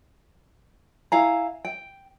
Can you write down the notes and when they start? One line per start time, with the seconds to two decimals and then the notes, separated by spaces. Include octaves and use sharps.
1.12 E4 F5 G#5 A#5
1.65 G5